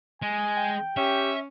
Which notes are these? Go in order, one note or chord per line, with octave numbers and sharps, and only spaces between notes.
G#3 G#5
G5
C#4 G4 E5